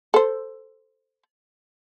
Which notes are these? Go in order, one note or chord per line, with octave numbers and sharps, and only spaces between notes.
A4 C5